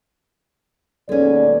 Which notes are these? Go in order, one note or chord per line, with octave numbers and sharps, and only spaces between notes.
D#2 B2 G#3 C#4 A4 D5